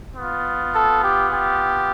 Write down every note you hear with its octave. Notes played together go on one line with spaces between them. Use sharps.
B3 F4
A4
G4
G4